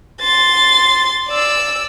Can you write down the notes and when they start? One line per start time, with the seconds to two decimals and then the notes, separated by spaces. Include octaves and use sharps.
0.21 C6 A6
1.28 D5 E6